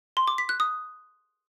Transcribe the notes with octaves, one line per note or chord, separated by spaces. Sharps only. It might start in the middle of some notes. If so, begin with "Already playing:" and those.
C6
D6
B6
F#6
D#6